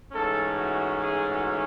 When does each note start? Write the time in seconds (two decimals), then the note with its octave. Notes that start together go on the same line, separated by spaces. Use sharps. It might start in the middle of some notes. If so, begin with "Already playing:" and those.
0.12 G#2 E3 A3 C#4 A4
0.56 F#4
1.01 G#4
1.30 F#4